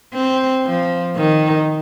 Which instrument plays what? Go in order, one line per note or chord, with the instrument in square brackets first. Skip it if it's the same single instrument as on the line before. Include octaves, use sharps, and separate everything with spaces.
[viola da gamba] C4
F3
D#3